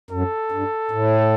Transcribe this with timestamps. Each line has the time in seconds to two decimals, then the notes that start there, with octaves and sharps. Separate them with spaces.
0.10 F#2 A4
0.52 G2
0.91 A2